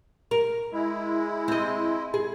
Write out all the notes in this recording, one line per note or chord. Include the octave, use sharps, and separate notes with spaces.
A#4
G#3 E4
C4 D#5
G#4